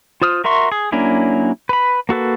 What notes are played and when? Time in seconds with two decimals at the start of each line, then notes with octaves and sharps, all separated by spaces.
0.22 F4 C5 D#6 F6
0.44 F#4 A#4 E5 C6 C#6
0.72 G#4
0.92 F#3 A#3 C#4 D4 E4
1.69 B4 B5
2.09 A#3 F#4 A4 B4